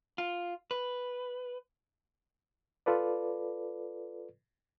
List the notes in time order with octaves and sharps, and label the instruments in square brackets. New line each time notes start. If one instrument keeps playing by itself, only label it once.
[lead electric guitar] F4
B4
[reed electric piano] F4 A4 B4 D5